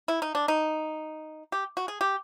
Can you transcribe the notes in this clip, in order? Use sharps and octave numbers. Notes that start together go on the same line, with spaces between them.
E4
D#4
D4
D#4
G4
F#4
G#4
G4